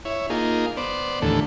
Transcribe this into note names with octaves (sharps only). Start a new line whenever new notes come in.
E4 C#5
A#3 D#4 F4 G#4
B3 C5 D5
D#2 A2 D3 E3 A4